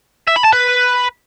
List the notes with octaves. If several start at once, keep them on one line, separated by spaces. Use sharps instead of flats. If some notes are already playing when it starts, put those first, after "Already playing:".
E5
B5
A5
B4